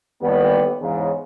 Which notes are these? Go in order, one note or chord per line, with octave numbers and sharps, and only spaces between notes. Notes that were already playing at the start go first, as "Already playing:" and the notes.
D#2 A2 G3 B3
E2 G#2 C#3